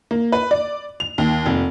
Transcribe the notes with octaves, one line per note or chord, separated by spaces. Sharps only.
A#3
B4
D5
F7
D#2
F1